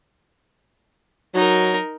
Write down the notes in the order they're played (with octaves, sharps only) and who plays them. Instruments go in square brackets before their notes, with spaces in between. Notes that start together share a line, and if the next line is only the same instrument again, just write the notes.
[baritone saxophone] F#3 [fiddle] D#4 A#4